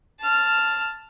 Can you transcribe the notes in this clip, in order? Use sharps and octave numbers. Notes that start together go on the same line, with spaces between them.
A5 F6